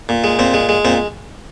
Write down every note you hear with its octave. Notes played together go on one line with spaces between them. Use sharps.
A#2
G#3
A#2 C4
G#3
G#3
A#2 C4